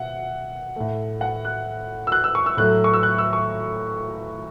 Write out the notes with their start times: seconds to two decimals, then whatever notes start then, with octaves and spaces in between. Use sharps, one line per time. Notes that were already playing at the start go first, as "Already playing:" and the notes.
Already playing: B2 E5 F#5
0.76 A2 A3
1.21 F#5
1.45 F#6
2.07 E6
2.12 F#6
2.24 E6
2.35 C#6
2.46 E6
2.57 A2 F#3 A3 F#6
2.84 C#6
2.94 E6
3.03 F#6
3.18 E6
3.33 C#6